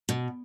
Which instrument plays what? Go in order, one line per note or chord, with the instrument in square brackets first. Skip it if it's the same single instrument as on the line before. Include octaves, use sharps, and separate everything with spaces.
[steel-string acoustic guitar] B2